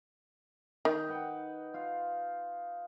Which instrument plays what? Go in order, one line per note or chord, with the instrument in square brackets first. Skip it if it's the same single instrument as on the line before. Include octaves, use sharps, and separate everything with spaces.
[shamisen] D#3 [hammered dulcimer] D#4
[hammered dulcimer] B4 F#5 G5
F4 F5